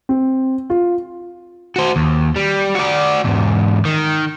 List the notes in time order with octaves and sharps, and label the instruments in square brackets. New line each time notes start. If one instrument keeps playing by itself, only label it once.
[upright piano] C4
F4
[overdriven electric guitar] F#4 C5
D#2
G3
F#4 D5
E2 G#2
D#3